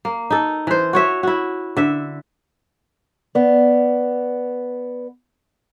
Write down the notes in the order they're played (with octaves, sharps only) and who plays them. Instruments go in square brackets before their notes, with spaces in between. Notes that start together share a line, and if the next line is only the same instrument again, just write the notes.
[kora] A#3
D#4 A4
E3 C5
F#4 C#5 E5
E4 F#4
D3 E5
[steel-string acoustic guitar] B3 D5